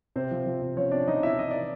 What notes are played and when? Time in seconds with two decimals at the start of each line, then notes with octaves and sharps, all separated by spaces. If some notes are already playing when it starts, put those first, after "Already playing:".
0.16 C3 C4 C5
0.31 F3
0.46 F3
0.61 C3
0.77 F3 C#4 C#5
0.91 C3 D4 D5
1.08 F3 D#4 D#5
1.23 C3 E4 E5
1.38 E3 D#5
1.51 E3 D5